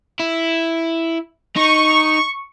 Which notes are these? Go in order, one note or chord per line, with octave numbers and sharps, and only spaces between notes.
E4
D#4 C#6